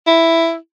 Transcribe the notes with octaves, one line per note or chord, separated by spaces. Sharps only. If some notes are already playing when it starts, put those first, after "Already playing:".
E4